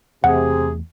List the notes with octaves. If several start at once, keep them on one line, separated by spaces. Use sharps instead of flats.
E2 C3 A3 G#4 F#5